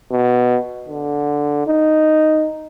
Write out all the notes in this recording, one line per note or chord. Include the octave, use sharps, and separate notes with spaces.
B2
D3
D#4